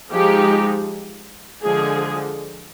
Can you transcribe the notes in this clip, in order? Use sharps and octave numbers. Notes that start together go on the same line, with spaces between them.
F3 G#3 D#4 G4
D3 F3 G#3 G#4